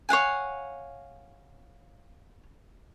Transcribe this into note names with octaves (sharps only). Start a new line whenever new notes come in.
C#5 F5 F#5 G#5